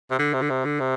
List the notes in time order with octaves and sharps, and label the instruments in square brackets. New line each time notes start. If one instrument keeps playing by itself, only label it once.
[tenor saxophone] C3
D3
C3
D3
C3
D3
C3